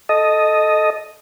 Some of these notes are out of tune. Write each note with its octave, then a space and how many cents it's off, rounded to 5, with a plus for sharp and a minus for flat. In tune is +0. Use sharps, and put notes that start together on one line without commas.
A4 -10 D#5 +0